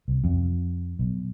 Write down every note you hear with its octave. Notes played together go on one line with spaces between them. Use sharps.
C2
F2
B1